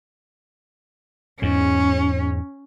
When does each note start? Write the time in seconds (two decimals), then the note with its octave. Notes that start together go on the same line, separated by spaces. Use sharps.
1.42 E2 G#2 C#4